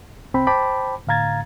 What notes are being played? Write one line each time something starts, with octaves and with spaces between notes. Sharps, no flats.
C2 C4 G5 B5
C5 G5 A5 B5 D6
A2 D3 F5 A#5 G#6 A6